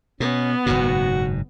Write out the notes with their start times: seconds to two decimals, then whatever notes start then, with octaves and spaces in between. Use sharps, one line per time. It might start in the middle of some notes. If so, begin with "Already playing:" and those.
0.20 B2 B3 C#4
0.66 F#1 G#2 B2 F#4